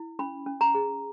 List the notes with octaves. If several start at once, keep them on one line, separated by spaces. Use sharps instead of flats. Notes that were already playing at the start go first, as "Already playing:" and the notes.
Already playing: E4
C#4 B5
C#4
A#5
G#4